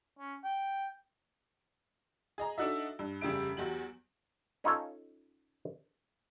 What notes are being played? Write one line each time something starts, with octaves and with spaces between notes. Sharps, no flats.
C#4
G5
G#4 D#5 A#5
D4 D#4 F#4 A4 D#5 E5
G2
F1 C#3 G3 G4 E5 D7
E2 F#3 G4 F#7
C#4 D#4 F4 A4 C#5